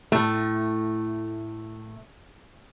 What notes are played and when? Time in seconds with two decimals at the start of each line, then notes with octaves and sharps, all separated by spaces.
0.12 A2 A3